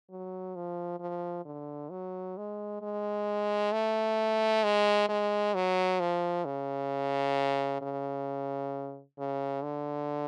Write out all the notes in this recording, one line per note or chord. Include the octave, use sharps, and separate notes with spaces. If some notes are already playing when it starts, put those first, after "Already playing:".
F#3
F3
F3
D3
F#3
G#3
G#3
A3
G#3
G#3
F#3
F3
C#3
C#3
C#3
D3